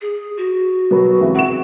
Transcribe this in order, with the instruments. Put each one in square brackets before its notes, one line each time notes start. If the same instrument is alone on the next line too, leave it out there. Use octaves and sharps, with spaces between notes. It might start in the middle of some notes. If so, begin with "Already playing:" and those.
[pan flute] G#4
F#4
[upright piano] B2 F#3 B3
C#2 C3 E3
[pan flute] C4 [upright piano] F#5 C#6 E7